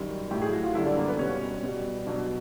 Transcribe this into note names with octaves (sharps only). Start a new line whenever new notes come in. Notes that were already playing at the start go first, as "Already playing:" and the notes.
Already playing: F#2 D#3 G3
A2 F#3 G4
G#4
F#4
F4
F#2 D3 G3 E4
D4
A#3
B3
B2 G3 C#4
B2 G3
B2 F#3 D4